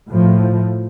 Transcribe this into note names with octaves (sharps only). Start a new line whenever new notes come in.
A2 F3